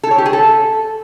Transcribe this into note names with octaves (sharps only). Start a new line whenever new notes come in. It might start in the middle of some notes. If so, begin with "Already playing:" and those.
A4
C#5
G4
G#4
A4